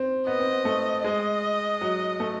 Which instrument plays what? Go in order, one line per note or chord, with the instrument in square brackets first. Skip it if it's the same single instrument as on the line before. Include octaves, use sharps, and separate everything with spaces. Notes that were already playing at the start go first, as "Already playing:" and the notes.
Already playing: [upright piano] C4
[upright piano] B3 [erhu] D#5
[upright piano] C4
B3
A3
[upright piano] G#3 [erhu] D#5
[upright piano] F#3
A3